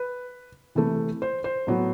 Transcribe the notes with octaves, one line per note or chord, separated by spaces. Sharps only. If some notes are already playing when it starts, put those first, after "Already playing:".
Already playing: B4
C3 E3 A3
C5
C5
A2 F#3 B3